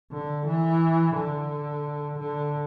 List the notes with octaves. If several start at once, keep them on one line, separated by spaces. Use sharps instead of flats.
D3
E3
D3
D3